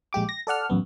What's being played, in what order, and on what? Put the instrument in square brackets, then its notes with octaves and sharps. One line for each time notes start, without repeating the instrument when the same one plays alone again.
[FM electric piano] A#1 G#3 G4 D6
A#6
A4 D5 F#5 F6
A1 F#2 B3